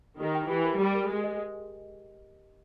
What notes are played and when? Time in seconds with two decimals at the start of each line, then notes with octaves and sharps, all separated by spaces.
0.19 D#3 G4
0.35 G5
0.49 E3 G4
0.65 A#4
0.79 G3 G4
0.95 A#4
1.10 G#3 G4
1.24 D#5